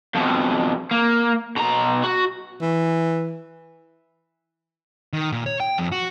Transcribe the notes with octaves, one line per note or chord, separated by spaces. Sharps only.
F2 B2
A#3
B2 A#5
F#4
E3
D#3
A#2
C#5
G5
F2
F#4